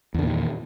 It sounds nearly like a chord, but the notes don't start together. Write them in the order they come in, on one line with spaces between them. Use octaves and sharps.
E2 D3 A#2 D#3